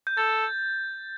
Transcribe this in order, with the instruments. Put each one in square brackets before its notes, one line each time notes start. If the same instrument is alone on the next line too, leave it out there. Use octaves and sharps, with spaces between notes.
[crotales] G6
[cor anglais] A4 [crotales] A6